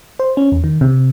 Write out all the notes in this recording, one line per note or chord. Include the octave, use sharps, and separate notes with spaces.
C5
C#4
E2
D#3
C3